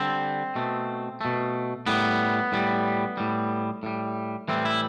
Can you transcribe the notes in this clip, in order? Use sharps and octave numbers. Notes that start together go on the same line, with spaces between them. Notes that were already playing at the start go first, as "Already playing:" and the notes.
Already playing: D3 G3 C4
B2 A3
B2 A3
A2 G3 B3
A2 G3
A2 G3
A2 G3
A2 E3 G3 C4
E4